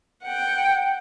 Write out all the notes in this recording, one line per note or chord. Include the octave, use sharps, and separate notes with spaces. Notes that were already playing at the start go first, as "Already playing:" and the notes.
F#5 G5